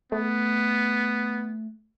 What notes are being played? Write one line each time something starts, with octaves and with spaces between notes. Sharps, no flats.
A3 B3